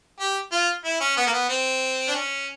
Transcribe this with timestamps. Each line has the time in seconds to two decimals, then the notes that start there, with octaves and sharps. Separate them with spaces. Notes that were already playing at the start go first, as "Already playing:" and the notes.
0.20 G4
0.52 F4
0.85 E4
1.00 C#4
1.17 B3
1.27 A#3
1.33 B3
1.49 C4
2.08 D4
2.14 C#4